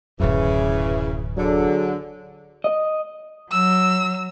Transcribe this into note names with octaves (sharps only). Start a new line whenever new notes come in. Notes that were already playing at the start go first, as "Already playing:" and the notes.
D1 F#2 C#3 E3
D3 F#3 D4 G#4
D#5
F#3 E6